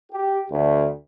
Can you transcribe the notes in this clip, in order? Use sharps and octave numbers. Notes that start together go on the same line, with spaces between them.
G4
D2